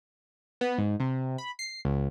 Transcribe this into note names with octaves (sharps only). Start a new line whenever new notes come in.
B3
G#2
C3
B5
C7
C#2